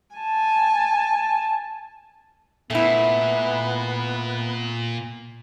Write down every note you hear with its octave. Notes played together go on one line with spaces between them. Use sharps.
G#5 A5
A#2 A3 B3 E4